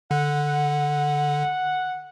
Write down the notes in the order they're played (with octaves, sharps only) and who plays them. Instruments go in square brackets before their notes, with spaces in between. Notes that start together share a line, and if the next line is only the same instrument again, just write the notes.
[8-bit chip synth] D3 [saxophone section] F#5